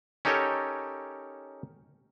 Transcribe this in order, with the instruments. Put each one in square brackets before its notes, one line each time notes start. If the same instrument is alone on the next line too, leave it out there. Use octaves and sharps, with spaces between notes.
[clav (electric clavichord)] C#4 D#4 G4 A4 A#4 C#5